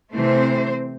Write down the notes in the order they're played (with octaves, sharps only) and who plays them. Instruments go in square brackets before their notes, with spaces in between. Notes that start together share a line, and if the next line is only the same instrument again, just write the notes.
[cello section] C3 E3 A3 C4 C5